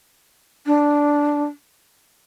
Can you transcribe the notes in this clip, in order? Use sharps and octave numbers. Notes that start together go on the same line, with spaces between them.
D4